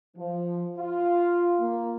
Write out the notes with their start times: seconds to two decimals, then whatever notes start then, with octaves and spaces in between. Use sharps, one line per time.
0.17 F3
0.79 F4
1.60 A#3